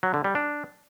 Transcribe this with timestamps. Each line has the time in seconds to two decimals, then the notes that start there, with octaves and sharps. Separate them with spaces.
0.03 F#3
0.14 D3
0.24 G3
0.35 D4